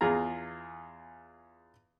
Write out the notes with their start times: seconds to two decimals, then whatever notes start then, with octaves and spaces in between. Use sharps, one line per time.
0.01 E2 F4 G#4 A#5